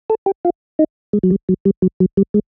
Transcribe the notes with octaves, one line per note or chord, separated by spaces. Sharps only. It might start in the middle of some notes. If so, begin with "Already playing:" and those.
A4
G4
F4
D#4
G#3
F#3
G3
F#3
G3
F#3
F#3
G3
G#3